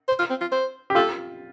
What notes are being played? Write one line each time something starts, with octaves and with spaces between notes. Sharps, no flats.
C5
F4
C4
F4
C5
G4
F4 A4